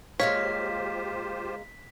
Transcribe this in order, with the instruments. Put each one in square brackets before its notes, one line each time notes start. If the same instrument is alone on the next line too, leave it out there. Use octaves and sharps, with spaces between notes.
[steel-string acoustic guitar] G#3 A#3 F5 [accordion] F4 G4 C5 [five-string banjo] C#5 [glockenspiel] B6